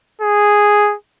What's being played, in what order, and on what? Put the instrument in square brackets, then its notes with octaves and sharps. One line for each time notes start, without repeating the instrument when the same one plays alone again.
[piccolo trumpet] G#4